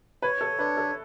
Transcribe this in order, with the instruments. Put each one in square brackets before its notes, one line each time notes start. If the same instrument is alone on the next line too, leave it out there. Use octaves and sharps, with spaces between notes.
[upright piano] B4 [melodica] C#5
[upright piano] A4
[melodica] D4 [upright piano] B4
[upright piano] A4